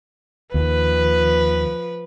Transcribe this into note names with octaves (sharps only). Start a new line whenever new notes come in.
D#2 F3 B4